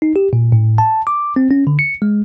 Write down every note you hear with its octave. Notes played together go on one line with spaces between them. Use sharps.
D#4
G4
A#2
A2
A5
D6
C4
C#4
D3
C#7
G#3